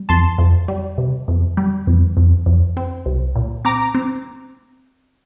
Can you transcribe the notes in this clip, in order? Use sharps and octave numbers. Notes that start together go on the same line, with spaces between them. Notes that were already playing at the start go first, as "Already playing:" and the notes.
Already playing: G3
F2 A5 C6
F2
G3
C3
F2
G3
F2
F2
F2
C4
C2
A#2
C4 A#5 D6
C4